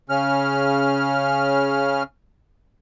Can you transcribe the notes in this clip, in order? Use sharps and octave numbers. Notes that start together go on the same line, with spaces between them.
C#3 C#4 F6